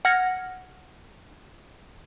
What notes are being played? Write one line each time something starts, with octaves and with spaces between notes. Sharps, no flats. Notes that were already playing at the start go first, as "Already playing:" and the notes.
F#5 F6 G#6 A#6